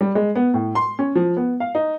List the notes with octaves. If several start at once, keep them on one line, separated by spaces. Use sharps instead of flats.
G3
G#3
B3
A2
C6
C#4
F3
B3
F5
D#4